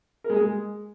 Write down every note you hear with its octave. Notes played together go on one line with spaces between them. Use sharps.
A#4
G#3
G#4
G#3